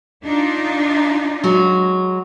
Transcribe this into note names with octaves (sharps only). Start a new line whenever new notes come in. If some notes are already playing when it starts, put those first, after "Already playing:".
D4 D#4 F4
F#3 G#3 F#4